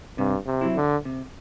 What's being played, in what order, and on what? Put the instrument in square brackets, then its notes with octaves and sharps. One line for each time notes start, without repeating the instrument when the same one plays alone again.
[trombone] G2 [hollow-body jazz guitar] C3
[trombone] C3
[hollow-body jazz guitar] F#3 C4 E4
[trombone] D3
[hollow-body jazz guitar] C3